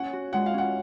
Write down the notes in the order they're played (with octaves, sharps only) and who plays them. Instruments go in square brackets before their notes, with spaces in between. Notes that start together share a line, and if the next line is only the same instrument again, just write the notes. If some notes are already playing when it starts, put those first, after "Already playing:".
Already playing: [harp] C#4 [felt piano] F#5
[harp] F#4
[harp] G#3 [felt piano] F#5
[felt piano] F5
[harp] C#4 [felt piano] F#5